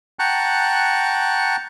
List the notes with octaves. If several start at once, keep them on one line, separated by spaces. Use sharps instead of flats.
F#5 G5 A5 A#5 C#6 F#6